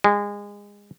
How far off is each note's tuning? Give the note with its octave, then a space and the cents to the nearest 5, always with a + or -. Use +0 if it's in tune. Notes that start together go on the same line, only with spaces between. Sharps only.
G#3 -25